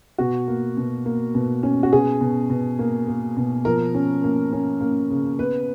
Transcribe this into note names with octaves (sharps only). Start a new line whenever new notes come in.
B2 F#4
A#3
B2
A#3
B2
C#4
F#4
B2 G#4
B2
B2
A#3
A#3
B2
F3 A#4
C#4
A#3
C#4
A#3
C#3
B3 B4